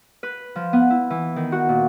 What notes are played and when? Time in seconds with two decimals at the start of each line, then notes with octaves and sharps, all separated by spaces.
0.23 B4
0.56 F3
0.73 B3
0.90 E4
1.10 E3
1.36 D#3
1.52 F#4
1.69 A#2